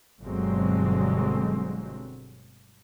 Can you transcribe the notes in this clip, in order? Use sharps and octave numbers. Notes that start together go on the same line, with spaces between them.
G1 B2 D3 F#3 G#3 C4